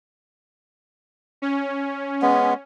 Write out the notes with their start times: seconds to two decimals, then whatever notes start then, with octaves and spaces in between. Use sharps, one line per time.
1.42 C#4
2.22 G#3 B3